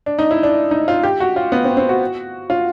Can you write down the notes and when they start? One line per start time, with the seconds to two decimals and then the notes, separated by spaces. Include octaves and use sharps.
0.06 D4
0.19 D#4
0.31 E4
0.43 D4
0.71 D#4
0.88 F4
1.03 G4
1.20 F#4
1.36 F4
1.52 B3
1.64 C4
1.77 C4
1.89 F#4
2.50 F4